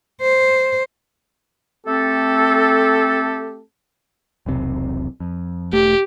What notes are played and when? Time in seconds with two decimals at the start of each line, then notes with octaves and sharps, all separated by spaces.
0.22 C5
1.85 A3 C4 G4 A4
4.46 E1 B1 C3
5.20 F2
5.73 E1 A3 G4